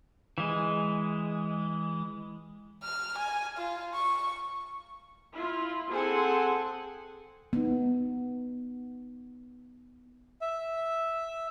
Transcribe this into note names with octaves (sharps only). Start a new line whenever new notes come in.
E3 G#3
F6
G#5
F4
C#6
E4 F4
C4 G#4 A4 F#5 G#5
B3 D#4
E5